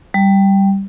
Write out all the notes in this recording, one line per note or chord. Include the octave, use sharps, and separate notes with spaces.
G3